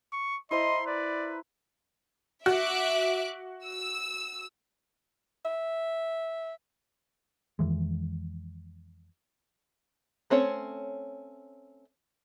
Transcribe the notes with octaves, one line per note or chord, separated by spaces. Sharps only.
C#6
E4 C5 D#5 A#5 C6
B4 D5
F#4 E5 D6 F#6
E6
E5
F2 D#3 E3 G#3
A3 C4 C#4 C#5